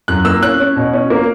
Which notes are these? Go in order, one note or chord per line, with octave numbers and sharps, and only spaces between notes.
F#2 F#6
A#3 E6
C#4 F#6
C#4
B2
C#4
A#3